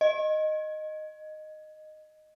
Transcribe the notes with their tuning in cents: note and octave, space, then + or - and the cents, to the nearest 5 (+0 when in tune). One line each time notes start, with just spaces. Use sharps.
D#5 -10